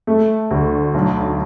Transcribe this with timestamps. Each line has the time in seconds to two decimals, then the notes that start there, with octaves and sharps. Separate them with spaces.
0.07 A3
0.51 D2
0.94 B1